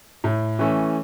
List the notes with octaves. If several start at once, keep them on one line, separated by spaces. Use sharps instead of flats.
A2
E3 A3 C#4